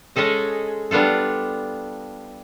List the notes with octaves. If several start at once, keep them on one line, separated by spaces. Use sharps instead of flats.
G#3 C#4 G#4 A4 D#5
G3 B3 D4 F4 A4